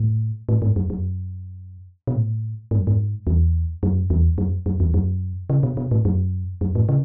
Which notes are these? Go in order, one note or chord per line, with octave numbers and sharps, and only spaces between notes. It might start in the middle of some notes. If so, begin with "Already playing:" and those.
Already playing: A2
A2
G#2
F#2
F#2
B2
A2
G#2
F#2
G#2
E2
F#2
E2
F#2
F#2
E2
F#2
C#3
B2
B2
A2
F#2
F#2
A2
C#3